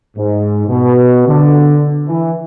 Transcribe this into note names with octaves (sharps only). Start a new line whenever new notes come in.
G#2
B2
D3
E3